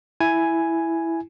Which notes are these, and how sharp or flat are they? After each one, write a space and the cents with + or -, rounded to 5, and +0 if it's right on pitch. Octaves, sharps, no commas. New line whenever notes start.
E4 +0 G#5 +0